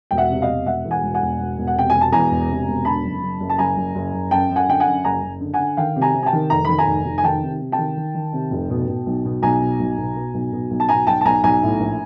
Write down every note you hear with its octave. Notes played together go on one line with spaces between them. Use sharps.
E1 G5
E5 F#5
C3
D#5 F5
E1
E1 E5 F#5
E2
F#5 G#5
E1
F#5 G#5
E1
E1
E1
F#5
C3 G5
G#5
E1
A5
E2 G#5 A#5
E1
C3
E1
D3 A5 B5
F#1
F#1
F#1
A5
F#1 G#5 A#5
F#1
F#1
F#1
F#2 G5 A5
F#2
F#5 G#5
D3 G5
F#5 G#5
F#2
F#1 G#5 A#5
F#1
D3
F#5 G#5
D3
D#3 F5 G5
C3
G#5 A#5
C3
G#5
G5 A5
D#3
F1 A#5
D#3 B5
G#5 A#5
F1
F1
G#5
D#3 G5 A5
C3
C3
G5 A5
D#3
D#3
D#3
C3
F1
B2
B2
B1
B2
B1 G#5 A#5
B2
B1
B2
B2
B1
B2
B1
A5
B2 G#5 A#5
B1 G5 A5
A5
B1 G#5 A#5
B1 G#5 A#5
A2
A#1